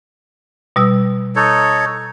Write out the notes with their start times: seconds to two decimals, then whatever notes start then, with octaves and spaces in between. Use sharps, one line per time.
0.76 B2 G3 E6
1.36 D#4 A4 C#5